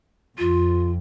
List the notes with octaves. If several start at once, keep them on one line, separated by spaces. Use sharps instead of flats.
F2 F4